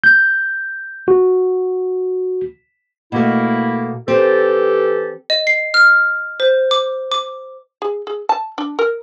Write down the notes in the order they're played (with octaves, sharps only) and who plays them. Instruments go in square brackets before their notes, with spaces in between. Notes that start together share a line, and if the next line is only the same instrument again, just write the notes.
[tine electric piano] G6
F#4
[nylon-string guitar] B2 A3 [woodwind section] A#3 E4
[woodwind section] E3 G4 A4 [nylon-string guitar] C4
[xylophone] D#5
C7
F6
C5
D6
D6
[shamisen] G#4
G#4
A5
D4
A#4